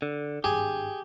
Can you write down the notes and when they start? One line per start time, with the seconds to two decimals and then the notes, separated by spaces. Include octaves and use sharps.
0.02 D3
0.44 G#1 G2 G4 G#4